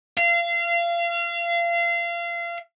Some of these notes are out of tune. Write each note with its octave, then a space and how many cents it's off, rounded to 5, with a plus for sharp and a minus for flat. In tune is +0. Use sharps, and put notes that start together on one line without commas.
F5 -30